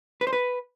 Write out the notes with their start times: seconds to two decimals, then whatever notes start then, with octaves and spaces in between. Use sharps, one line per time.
0.21 B4
0.27 C5
0.33 B4